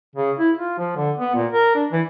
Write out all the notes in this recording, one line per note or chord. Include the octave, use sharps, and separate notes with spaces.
C#3
E4
F4
F3
D3
B3
A#2
A#4
D4
E3